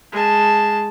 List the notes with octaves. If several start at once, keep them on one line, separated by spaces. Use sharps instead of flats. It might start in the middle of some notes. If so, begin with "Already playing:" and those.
G#3 A5